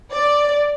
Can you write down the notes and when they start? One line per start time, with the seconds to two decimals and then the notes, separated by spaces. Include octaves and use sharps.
0.13 D5